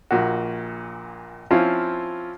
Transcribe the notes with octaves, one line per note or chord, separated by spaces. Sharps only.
A#1 A#2 F#4
F3 C4 C#4 E4 F4